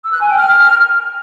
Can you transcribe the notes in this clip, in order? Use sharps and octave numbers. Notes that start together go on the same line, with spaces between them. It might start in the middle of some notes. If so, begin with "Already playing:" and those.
E6
F#6
G#5
G5
F6